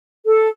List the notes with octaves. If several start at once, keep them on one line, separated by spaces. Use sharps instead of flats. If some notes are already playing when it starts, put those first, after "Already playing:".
A4